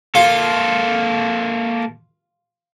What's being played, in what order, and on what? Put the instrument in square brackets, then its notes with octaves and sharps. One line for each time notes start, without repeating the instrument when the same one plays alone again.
[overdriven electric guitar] A#3 A4 [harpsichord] F4